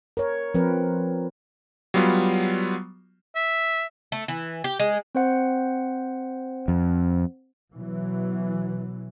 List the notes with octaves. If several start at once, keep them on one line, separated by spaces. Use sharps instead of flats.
A#4 C#5
F3 C4 A#4 B4
F#3 G3 B3 F4
E5
A3
E3
G4
G#3
C4 C5 F#5
F2
B2 E3 F#3